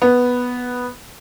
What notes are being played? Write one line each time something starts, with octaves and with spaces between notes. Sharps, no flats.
B3